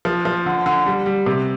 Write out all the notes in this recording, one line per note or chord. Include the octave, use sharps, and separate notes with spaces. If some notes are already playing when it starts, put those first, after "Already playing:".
F3
F3
D3
D3
G3
G3
C3